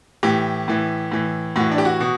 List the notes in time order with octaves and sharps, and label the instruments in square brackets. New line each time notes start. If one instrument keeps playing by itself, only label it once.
[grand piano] A2 E3 G4
A2 E3
A2 E3
A2 E3 F#4
D4
G4
F#4
B2